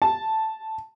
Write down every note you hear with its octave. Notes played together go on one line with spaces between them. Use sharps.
A5